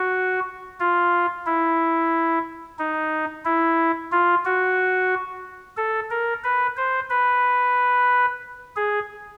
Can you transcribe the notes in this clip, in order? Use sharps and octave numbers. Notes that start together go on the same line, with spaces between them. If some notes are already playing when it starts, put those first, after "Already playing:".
Already playing: F#4
F4
E4
D#4
E4
F4
F#4
A4
A#4
B4
C5
B4
G#4